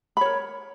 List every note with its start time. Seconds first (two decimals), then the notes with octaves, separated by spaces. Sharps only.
0.17 B5
0.21 C#5
0.25 A#4